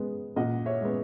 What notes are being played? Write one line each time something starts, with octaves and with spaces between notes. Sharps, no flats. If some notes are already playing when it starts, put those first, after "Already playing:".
Already playing: G#3 B3
A#2 D#5 F#5
C#5 E5
G#3 B3